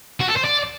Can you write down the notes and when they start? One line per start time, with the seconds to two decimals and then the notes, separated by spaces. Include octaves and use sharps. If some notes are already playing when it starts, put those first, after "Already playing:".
0.20 F#4
0.28 A4
0.36 C5
0.44 D5